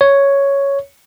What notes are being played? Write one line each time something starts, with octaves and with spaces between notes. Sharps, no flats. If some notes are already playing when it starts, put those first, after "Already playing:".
C#5